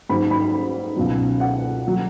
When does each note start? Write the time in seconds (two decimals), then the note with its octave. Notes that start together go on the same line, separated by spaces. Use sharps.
0.09 G#2 F#3 B5
0.31 B5
0.96 C#2 B2 F#3
1.40 F#5
1.88 F#3